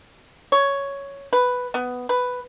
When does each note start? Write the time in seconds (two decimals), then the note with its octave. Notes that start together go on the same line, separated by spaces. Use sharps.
0.52 C#5
1.33 B4
1.74 B3
2.09 B4